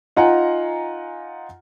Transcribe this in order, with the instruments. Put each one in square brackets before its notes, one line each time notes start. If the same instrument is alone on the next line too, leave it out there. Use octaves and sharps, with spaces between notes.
[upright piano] D#4 F4 F#5 G#5 A#5